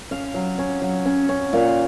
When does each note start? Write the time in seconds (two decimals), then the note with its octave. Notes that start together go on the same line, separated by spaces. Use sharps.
0.11 C#4 F5
0.34 F#3
0.59 C#4
0.82 F#3
1.06 C#4
1.29 C#4
1.53 A#2 F5